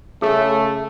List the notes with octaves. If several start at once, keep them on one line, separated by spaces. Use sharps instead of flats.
C#3 A3 G#4